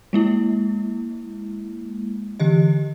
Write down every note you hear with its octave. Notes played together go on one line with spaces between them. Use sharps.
G#3 A#3 E4
D3 E3 G4 D#5